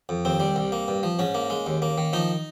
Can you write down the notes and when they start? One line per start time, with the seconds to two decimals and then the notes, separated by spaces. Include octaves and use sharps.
0.09 F2
0.25 D#2 C4
0.40 G3
0.56 C2
0.72 A#3
0.88 G2
1.03 F3
1.19 G#2 C#4
1.35 A#3
1.50 G#3
1.66 D#2
1.82 A#3
1.98 D#3
2.13 F3 D#4